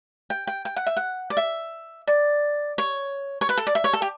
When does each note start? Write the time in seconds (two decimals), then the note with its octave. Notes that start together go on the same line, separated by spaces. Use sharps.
0.30 G5
0.47 G5
0.65 G5
0.76 F#5
0.86 E5
0.97 F#5
1.30 D5
1.37 E5
2.07 D5
2.78 C#5
3.41 C#5
3.49 B4
3.57 A4
3.67 D5
3.75 E5
3.84 C#5
3.93 A4
4.02 G4